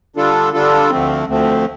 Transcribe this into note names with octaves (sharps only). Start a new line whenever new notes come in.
D3 G3 D4 F4 A4
D3 G3 D4 F4 A4
D2 D3 F3 A3 C4
D2 D3 F3 A3 C4